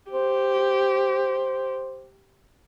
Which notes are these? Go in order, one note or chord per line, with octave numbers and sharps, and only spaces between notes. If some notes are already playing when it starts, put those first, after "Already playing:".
G4 C5